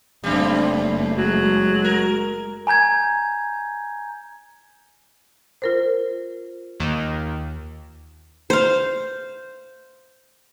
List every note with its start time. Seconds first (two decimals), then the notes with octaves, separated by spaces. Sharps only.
0.24 F#1 F#2 G3 A3 C4
1.17 F#3 G#3
1.84 A#4
2.67 G#5 A#5 G6 G#6
5.62 F4 A#4 C5
6.80 D#2 D#3
8.50 C5 F5